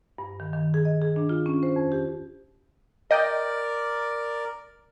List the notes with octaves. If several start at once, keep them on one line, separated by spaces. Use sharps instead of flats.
G2
D#3
D#3
G#4
D#5
G#4
D4
F4
C#4
C5
F2
G4
A#4 D5 D#5 G5